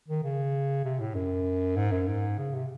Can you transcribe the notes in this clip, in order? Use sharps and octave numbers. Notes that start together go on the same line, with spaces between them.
D#3
C#3
C3
A2
F#2
G#2
F#2
G#2
C#3
C3